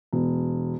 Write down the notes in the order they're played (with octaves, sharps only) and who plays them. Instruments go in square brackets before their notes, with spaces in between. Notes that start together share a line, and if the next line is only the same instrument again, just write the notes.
[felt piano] E1